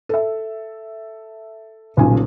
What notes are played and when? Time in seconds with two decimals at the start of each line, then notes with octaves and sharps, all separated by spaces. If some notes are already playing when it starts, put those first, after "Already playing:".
0.09 A4 E5
1.97 D#1 B1 C#3 F4 G#5